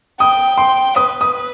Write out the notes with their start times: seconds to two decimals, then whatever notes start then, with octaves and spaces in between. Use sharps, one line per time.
0.20 G5 D#6
0.58 C6
0.96 B4 D#6
1.21 D#6